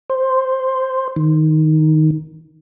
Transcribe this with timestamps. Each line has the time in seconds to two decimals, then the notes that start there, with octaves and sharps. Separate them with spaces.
0.10 C5
1.16 D#3